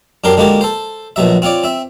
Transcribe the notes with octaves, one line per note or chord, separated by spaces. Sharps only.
F#2 D4 G4 A#4 C6
D3 G#3 A#3 F#4 G4
A4 C5
A#1 B2 F#3 E5
C4 F4 C#5 D5
C4 E5